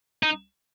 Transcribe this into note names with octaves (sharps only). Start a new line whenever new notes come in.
D#4